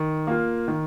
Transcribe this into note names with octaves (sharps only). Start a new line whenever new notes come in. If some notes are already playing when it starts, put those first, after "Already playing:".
Already playing: D#3
A#3 F4
D#3